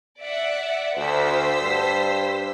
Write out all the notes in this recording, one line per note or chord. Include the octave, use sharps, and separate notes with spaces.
D5 E5 F#5
D2 C5 E6 B6
G2